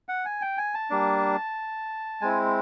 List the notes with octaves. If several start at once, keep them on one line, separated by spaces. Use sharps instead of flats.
F#5
G#5
G5
G#5
A5
G3 A#3 D4
G#3 C4 E4 G#5